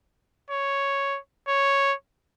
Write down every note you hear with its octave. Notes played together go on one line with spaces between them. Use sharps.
C#5
C#5